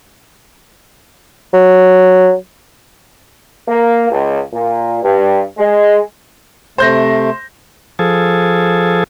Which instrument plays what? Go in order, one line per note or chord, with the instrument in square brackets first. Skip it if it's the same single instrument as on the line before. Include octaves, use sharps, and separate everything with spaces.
[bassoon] F#3
[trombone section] A#3
C#2
A#2
G2
G#3
[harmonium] C3 A3 [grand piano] C5 G6 A#6
[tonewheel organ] F3 G#4 A4